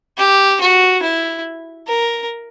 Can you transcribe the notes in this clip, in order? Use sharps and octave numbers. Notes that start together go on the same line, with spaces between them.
G4
F#4
E4
A#4